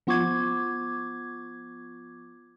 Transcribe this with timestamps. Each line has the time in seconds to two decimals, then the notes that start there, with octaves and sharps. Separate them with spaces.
0.07 F3 B3 F4 C#6 D6 G#6